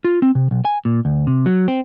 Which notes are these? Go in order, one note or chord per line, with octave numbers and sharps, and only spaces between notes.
F4
C4
C3
B1
G#5
A#2
D2
C3
F#3
C4